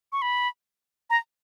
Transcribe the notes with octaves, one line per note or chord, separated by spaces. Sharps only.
C#6
B5
A#5